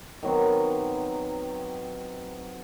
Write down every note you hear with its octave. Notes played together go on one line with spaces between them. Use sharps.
D#3 F#3 B3 C4